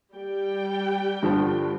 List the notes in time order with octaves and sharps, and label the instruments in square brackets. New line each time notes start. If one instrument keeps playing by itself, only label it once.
[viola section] G3 G4 G5
[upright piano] G2 D3 F3